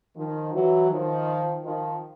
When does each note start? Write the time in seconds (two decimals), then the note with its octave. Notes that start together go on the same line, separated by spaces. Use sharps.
0.16 D#3 F3
0.53 E3 F#3
0.90 D#3 F3
1.63 D#3 F3